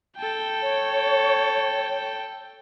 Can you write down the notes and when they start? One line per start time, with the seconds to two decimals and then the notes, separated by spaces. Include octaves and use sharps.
0.17 A4 G5
0.62 C#5